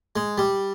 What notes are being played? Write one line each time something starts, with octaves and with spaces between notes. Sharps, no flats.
G#3
G3